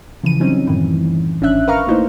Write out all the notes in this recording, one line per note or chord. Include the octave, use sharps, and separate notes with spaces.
C#3 E3 F3 D#7
E3 F#3 G3 C4 C#4 D#4
F#2 A2 D#3 E3
G#1 C#4 D4 E5 F#6
A#4 B4 F5 A#5 C#6 F6
A3 A#3 D#4 E4 C5